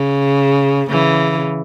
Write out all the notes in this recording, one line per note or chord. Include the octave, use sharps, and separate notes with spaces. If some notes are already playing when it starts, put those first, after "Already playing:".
Already playing: C#3
C#3 E3